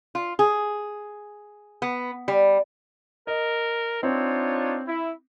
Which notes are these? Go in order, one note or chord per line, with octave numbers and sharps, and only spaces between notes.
F4
G#4
B3
G3
A#4 D#5
C4 D4 D#4 F4 C#5
E4